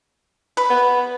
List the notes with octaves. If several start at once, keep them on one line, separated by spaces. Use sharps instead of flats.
B4
B3